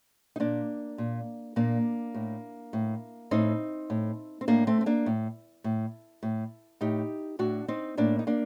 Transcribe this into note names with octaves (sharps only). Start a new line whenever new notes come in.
D#4
A#2 A#3 D4
A#2
A#2 A#3 D4
A2
A2
A2 C4 D#4
A2
C4
A2 A#3 D4
A3 C4
C4
A#3 D4
A2
A2
A2
A2 D#4 G4
A2 D4 F#4
C4 D#4
A2 A#3 D4
D#4
A#3 D4